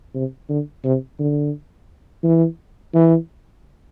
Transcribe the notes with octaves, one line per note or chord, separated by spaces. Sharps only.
C3
D3
C3
D3
E3
E3